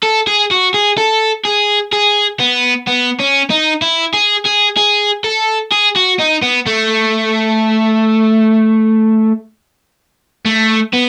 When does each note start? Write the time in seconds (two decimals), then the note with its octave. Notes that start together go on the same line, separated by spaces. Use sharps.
0.03 A4
0.27 G#4
0.51 F#4
0.74 G#4
0.98 A4
1.45 G#4
1.93 G#4
2.40 B3
2.87 B3
3.19 C#4
3.50 D#4
3.82 E4
4.14 G#4
4.45 G#4
4.77 G#4
5.24 A4
5.72 G#4
5.96 F#4
6.19 D#4
6.42 B3
6.67 A3
10.45 A3
10.93 B3